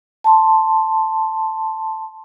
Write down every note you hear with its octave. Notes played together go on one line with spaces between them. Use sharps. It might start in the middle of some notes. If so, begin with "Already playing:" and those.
A5 C6